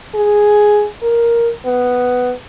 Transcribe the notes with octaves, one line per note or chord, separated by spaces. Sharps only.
G#4
A#4
B3